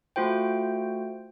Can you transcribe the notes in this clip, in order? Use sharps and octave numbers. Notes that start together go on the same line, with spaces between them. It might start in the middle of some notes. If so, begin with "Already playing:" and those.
A3 F4 F#4 C5 G5